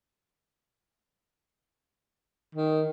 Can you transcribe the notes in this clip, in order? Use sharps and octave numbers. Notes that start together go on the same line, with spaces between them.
D#3